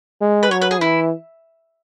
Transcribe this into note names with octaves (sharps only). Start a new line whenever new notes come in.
G#3
B4
F#3 C#5
B4
G#4
E3 E4